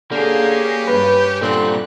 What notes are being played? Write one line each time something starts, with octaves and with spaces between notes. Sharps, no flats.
D3 A#3 C#4 G4 G#4 F5
G2 B4
A#2 D3 G3 C4 F#6